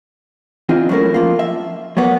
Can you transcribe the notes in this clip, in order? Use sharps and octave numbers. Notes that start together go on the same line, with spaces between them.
E3 C4 D4 D#4 F4 G#4
F#3 G#3 A3 C#4 E4 A#4
F3 A#3 F4
E5
F#3 A#3 B3 C#5